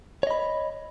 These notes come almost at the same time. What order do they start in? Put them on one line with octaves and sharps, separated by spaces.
C#5 D#5 B5